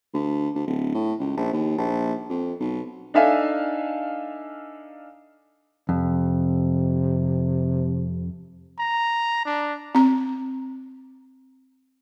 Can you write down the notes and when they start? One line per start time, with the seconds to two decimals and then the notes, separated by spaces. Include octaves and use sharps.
0.13 D2
0.55 D2
0.67 D1
0.94 A2
1.20 C#2
1.37 A#1
1.53 D#2
1.78 A#1
2.29 F2
2.60 B1
3.14 D4 D#4 A4 E5 F5 G#5
5.89 F2 C3
8.79 A#5
9.46 D4
9.95 C4 A#5